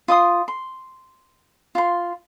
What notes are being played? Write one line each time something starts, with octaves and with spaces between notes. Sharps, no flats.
F4 D#5 C6 D#6
C6
F4 C6